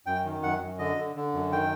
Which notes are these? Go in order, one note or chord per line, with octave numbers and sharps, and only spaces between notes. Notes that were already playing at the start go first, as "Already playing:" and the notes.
F#2 G5
D#3
F#2 F#5
F#2
D3 D#5
D3
D3
F#2
D#3 G5